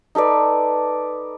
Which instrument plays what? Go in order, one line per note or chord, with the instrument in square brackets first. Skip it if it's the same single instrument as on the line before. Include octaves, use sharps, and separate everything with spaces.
[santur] D#4 A4 B4 D5